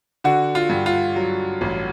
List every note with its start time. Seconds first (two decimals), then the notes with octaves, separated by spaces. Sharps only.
0.24 D3 F#4
0.55 F4
0.70 G2
0.86 F4
1.16 F#3
1.61 A1